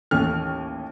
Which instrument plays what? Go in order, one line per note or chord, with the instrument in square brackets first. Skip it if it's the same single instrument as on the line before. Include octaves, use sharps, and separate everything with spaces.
[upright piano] A1 D#2 F6